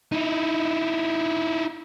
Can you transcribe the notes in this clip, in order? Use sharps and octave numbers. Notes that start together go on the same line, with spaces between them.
D#4 E4